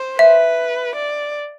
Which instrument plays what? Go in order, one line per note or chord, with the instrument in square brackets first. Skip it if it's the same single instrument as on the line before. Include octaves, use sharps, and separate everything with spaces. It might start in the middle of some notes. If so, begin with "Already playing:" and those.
Already playing: [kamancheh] C5
[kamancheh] B4 [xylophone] E5
[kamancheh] D5